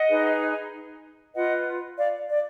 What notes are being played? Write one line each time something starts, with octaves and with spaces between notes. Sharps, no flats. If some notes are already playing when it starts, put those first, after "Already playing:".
Already playing: D#5 F#5
D#4 G#4 B4
F4 B4 D#5 F#5
D5 F5
D5